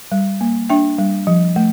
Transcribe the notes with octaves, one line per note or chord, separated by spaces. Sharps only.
G3
A#3
D4 E5 G5
G3
F3
A3